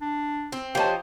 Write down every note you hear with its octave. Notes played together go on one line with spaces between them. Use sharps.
D4
C4
F3 D#4 G4 C5 C#5 A5